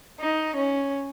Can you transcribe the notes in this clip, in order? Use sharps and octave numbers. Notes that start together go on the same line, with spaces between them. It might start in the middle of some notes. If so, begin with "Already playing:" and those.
D#4
C#4